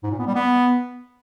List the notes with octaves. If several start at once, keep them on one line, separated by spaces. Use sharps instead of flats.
G#2
A#2
B3
G3
B3